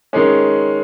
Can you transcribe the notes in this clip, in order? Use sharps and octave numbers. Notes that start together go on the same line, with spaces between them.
D#3 G#3 C#4